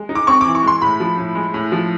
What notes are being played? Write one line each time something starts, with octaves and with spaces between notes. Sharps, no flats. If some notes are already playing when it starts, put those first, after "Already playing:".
Already playing: G#3
D#4
D6
C4 C#6
E3 D6
C#6
G#3 C6
A2 B5
F3
A2
G#3
A2
F3